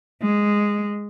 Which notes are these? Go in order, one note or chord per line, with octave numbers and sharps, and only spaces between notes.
G#3